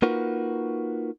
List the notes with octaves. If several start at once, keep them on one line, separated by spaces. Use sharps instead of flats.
A#3 D#4 F4 F#4 A#4 B4